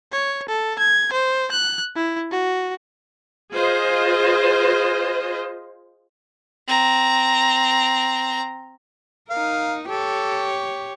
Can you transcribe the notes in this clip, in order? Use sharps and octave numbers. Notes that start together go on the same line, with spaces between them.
C#5
A4
G#6
C5
F#6
E4
F#4
F4 G#4 C5 D#5
C4 A#5
D#4 A#4 F5
G4 A4 C#5